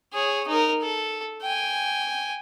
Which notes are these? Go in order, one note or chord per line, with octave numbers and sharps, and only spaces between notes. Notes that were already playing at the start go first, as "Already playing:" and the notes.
G#4 C#5
D#4 A#4
A4
G5 G#5